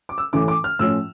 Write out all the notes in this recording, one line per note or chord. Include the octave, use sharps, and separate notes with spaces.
D6
E6
A2 E3 A3 C#4 D6
D6
F6
A2 F3 C#4 F4 E6